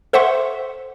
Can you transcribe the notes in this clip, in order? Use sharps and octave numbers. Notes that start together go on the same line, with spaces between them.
A4 C5 E5 F#5 C6 C#6